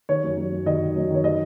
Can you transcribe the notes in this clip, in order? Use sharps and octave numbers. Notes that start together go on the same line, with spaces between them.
D#3 C#5
F#2
F#2
F#2
D#3 D#5
D#3
F#2
D#3 C#5
D#5